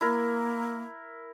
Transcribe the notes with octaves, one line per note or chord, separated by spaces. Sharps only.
A#3 E4 A#4